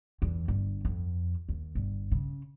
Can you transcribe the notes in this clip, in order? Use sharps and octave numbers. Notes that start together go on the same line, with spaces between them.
E2
G1
F2
D#2
G1
C#3